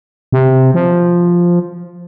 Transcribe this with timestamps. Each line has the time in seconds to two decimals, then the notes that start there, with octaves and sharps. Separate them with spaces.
0.32 C3
0.74 F3